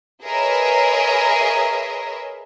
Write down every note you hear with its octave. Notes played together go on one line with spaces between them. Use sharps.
G#4 A#4 B4 C#5 D#5 E5